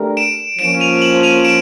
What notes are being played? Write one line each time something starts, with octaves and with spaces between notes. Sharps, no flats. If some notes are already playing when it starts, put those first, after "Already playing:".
Already playing: A3 D4 G4 A#4
D7 E7
F3 A#3 C#4 D7 E7
D#7 F7
E7 F#7
D#7 F7
D7 E7